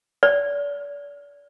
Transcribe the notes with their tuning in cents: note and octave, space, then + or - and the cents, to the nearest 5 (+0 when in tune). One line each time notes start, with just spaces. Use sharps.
D5 -35